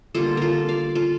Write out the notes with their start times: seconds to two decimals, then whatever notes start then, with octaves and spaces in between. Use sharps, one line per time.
0.15 D3 G3 A#3 F4 A4
0.37 F4 A4 A#4
0.69 D5 F5
0.95 F4 A4